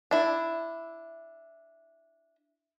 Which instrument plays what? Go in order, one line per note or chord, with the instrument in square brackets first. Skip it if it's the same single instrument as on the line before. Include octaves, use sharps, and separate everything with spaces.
[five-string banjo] D4 E4